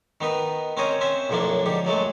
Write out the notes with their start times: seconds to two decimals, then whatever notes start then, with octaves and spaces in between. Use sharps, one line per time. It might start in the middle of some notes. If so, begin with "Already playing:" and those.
0.21 D#3 B3 D#4 B4
0.77 C4 C#4 A#4 C5 C#5 D#5
1.01 C4 C#4 C5 E5
1.29 B1 F#2 A2 F3 A#3 D4
1.66 G#2 D3 G4
1.85 F#2 F#3 G#3 A3